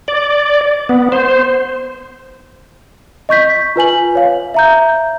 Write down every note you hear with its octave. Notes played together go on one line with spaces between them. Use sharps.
D5
B3
C5
D#5 C#6 G6 B6
F4 B4 G#5 F#7
C#5 F5
E5 A#5 G6